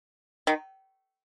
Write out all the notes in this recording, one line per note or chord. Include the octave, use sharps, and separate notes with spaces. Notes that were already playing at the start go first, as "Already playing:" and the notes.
D#3